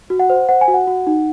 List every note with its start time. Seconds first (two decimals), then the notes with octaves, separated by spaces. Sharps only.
0.10 F#4
0.19 F#5
0.30 C5
0.49 C5 F#5
0.61 G#5
0.68 F#4
0.74 F#5
0.87 F#4
1.07 D#4